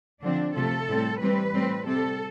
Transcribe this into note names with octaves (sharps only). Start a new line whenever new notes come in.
D3 F3 C4 D4
C3 F3 A3 A4
A2 G3 C4
E3 G3 C4 B4
A2 G3 C4
C3 G3 C4 A4